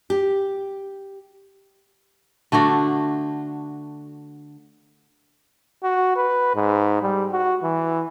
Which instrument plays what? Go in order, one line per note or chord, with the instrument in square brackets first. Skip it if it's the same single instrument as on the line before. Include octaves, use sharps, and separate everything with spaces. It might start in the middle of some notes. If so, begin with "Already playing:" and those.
[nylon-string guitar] G4
[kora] D3 A3 D4 F#4
[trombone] F#4
B4
G#2
G3
F#4
E3